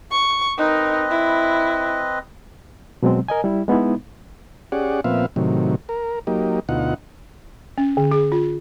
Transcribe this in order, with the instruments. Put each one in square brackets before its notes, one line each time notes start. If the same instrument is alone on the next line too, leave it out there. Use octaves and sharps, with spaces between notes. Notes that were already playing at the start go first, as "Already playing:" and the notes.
[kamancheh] C#6
[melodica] C4 B4 D#5 [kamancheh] D#4 A#4
[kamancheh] E4
[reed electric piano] B2 F#3 G#3 C4
A#4 D#5 G#5
G3 E4
G#3 B3 D#4 E4
[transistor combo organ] C#4 G4 G#4 D5 F#5
A#2 F3 B3 C4 E5 F5
A2 C3 D#3 F#3
A#4
F#3 A#3 D#4 G4
D2 B2 D#4 F4 F#5
[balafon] C#4
D3
G#4
F4